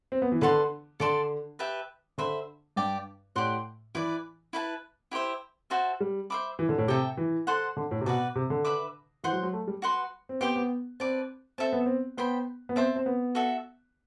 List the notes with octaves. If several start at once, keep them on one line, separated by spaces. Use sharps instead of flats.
C4
B3
E3
D3 B4 F#5 A5 C6
D3 A4 D5 A5 C6
G4 B4 E5 A5
D3 C5 E5 B5
G2 G4 D5 G5
A2 G4 D5 F#5 C6
E3 E4 B4 D5
E4 B4 F#5 A5
E4 G4 C5 E5
F#4 C5 E5 A5
G3
C5 E5 B5 D6
E3
D3
A2
C3 A4 E5 G5
E3
A4 C5 F#5 C6
D3
A2
C3
B2 F#4 B4 D5
C3
D3
B4 E5 B5 D6
E3 C5 F#5 C6
F#3
F#3
A3
G3
F#4 B4 F#5 C6
C4
B3 G4 C5 G5 D6
B3
C4 B4 D5 A5
C4 A4 E5 A5
B3
C4
B3 C5 G5 B5
B3
C4 C5 E5 A5
C4
B3
F#4 A4 E5 A5